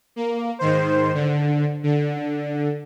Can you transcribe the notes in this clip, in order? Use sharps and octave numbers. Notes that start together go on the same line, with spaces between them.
A#3
G#2 D#3 C5
D3
D3